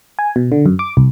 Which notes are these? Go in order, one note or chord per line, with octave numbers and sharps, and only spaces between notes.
G#5
B2
D3
F#2
D6
C2